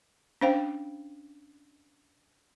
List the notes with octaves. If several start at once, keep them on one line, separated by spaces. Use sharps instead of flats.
C#4 D4 C5 F5 G5